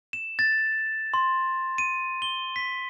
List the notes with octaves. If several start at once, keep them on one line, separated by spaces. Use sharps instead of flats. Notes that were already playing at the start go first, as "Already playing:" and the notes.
E7
A6
C6
D#7
G7
B6